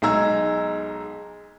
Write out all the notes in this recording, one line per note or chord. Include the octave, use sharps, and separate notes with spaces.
B1 G#3 D#4 A#5 E6 G#6